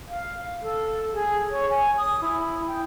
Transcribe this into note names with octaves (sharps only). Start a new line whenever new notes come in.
F5
A4
G#4
C#5
G#5
D#6
E4
G5